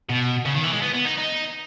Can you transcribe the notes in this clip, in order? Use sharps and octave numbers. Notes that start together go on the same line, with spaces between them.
B2
C#3
D#3
E3
G#3
B3
B3
D#4
D#4